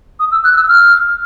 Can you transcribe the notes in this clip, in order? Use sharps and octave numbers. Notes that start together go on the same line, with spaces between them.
D#6
E6
F#6
E6
F6